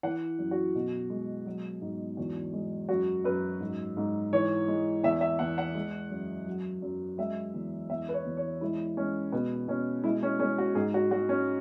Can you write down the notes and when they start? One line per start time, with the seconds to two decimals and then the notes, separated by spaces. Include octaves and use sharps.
0.03 E3 F#5
0.39 F#2
0.51 F#4
0.75 B2
1.10 G#3
1.46 F#3
1.81 G#2
2.17 E2 F#4
2.53 G#3
2.89 F#2 F#4
3.24 F#2 B4
3.60 G#2
3.97 G#2
4.33 E3 C#5
4.68 G#3
5.04 E2 E5
5.21 E5
5.39 E2 F#5
5.58 F#5
5.75 G#3
6.10 F#2
6.46 F#3
6.82 F#2
7.18 G#3 E5
7.54 E2
7.90 E2 E5
8.09 B4
8.14 C#5
8.26 E2
8.37 C#5
8.61 G#3 E4
8.97 G#3 C#4
9.32 B2 B3
9.68 B2 C#4
10.04 G#3 E4
10.23 C#4
10.39 G#3 C#4
10.58 F#4
10.75 G#2 G#4
10.94 F#4
11.11 G#3 F#4
11.29 C#4